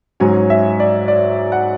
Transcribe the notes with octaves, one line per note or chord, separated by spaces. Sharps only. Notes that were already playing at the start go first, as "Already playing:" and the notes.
G#2 F#3 C#4 G#5
E5
D5
D5
F#5